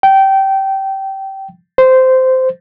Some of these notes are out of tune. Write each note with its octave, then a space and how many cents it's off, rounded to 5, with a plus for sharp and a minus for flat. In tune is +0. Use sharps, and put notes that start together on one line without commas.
G5 -20
C5 -15